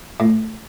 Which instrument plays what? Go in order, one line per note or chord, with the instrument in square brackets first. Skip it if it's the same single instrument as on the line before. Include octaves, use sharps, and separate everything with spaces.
[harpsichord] A2